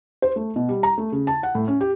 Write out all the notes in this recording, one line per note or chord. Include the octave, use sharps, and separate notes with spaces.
C5
A3
B2
G3
A#5
A3
C#3
A5
F#5
A2
C#4
G4